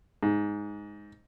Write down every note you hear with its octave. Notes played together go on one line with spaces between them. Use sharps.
G#2